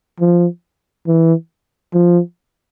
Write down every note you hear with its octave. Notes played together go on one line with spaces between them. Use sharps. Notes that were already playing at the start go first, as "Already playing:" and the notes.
F3
E3
F3